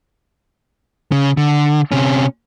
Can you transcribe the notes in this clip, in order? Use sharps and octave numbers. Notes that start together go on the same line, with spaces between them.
C#3
D3
C3 C#4